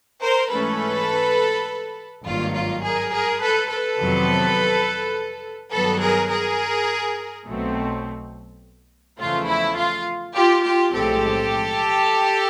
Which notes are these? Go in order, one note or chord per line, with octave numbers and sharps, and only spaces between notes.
A#4 C5
G#2 E3 A3 C#4 A4 B4
G#1 G2 D#3 F#3 A#3 F4
F4
G#4 A#4
G#4 A#4
A4 B4
A4 B4
F2 C3 D#3 F#3 B3
G2 D#3 F#3 B3 A4 B4
G#4 A#4
G#4 A#4
B1 B2 F#3 A3 C4
E2 C#3 F3 A3 F4
E4
F4
F4 G4
F4 G4
B1 A2 F3 G#3 C4 G4 A4